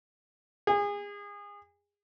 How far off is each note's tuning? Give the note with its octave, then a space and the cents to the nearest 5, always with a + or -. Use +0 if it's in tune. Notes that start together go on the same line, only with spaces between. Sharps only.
G#4 -30